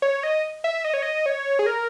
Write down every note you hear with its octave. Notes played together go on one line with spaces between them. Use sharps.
C#5
D#5
E5
D#5
C#5
D#5
C#5
G#4
A#4